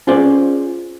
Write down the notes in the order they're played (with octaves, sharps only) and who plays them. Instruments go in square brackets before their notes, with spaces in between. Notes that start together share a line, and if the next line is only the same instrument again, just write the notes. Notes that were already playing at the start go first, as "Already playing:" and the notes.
[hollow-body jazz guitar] C#4 F4 G#4 C5 D5